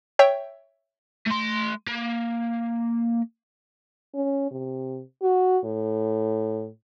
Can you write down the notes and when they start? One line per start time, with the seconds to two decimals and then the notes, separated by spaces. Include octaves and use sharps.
0.19 C#5 E5 G5
1.26 A3 C6
1.87 A#3
4.14 C#4
4.51 C3
5.22 F#4
5.64 A2